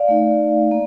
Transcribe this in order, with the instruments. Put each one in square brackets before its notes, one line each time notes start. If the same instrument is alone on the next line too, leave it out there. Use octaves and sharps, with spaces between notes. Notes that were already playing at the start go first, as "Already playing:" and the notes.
Already playing: [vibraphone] D5 F5
A3 D#4
A#3